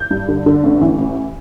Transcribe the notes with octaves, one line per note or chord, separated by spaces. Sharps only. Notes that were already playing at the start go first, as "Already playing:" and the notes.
Already playing: G6
G2
D3
D3
A1
E3
A1